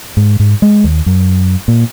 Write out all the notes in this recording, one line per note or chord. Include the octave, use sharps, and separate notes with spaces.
G#2
G#2
G#3
D#2
F#2
A#2